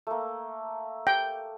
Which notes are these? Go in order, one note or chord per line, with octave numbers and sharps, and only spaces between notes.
A3 A#3
G5